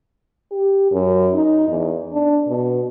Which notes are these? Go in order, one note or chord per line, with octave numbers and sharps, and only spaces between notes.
G4
F#2
D#4
E2
D4
B2